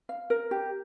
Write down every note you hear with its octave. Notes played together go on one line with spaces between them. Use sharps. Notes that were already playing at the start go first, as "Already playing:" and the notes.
F5
A#4
G4